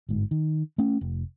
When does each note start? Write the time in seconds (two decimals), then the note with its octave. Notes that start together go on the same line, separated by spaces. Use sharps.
0.09 G1 G#2
0.31 D#3
0.78 A3 C#4
1.01 F1